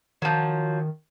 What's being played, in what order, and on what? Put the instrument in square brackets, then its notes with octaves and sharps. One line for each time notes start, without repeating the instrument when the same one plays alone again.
[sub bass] D#3 [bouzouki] F3 F#3